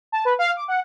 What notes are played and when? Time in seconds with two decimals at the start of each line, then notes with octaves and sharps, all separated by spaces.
0.12 A5
0.25 B4
0.39 F5
0.57 D6
0.68 F#5